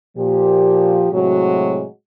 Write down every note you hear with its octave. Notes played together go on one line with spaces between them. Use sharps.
A#2 F3 G4
A2 C3 F#3 G#3 F#4